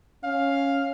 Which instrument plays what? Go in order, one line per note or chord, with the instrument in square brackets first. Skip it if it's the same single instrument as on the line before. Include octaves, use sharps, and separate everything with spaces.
[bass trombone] C#4 [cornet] F5